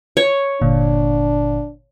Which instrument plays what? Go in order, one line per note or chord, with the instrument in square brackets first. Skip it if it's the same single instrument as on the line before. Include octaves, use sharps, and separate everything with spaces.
[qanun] C#5
[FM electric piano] G1 A#2 D3 [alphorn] D4